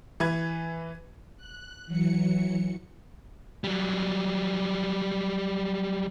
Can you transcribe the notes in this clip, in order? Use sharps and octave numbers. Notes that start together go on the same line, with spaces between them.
E3 B4 G#6
F#6
E3 F#3 C#7
F#3 G3